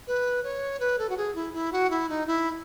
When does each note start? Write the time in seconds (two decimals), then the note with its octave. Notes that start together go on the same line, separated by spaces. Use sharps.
0.07 B4
0.44 C#5
0.80 B4
0.99 A4
1.09 F#4
1.17 G#4
1.35 E4
1.54 E4
1.73 F#4
1.91 E4
2.09 D#4
2.27 E4